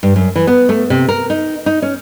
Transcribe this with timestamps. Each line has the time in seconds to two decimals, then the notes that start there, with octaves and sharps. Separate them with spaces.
0.03 G2
0.16 F#2
0.36 E3
0.47 B3
0.69 A3
0.90 C3
1.09 A#4
1.30 D#4
1.66 D#4
1.82 C#4